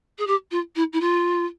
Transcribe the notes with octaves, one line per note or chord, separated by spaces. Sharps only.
G#4
G4
F4
E4
E4
F4